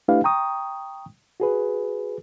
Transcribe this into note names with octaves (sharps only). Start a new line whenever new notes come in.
A3 D4 E4 G4 B4 F5
G5 A#5 C#6 D#6
F#4 G#4 B4